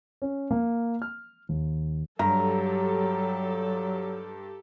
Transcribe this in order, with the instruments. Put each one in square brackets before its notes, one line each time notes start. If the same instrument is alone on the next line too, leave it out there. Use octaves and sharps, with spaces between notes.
[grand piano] C#4
A#3
F6
D#2
[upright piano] G2 [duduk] F#3 [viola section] G4 A4 [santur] A#5